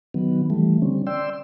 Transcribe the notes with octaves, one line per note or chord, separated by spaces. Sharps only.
D#3 F#3 B3
E3 G3 A3
D3 G3 C4 C#4
D5 G5 C6 E6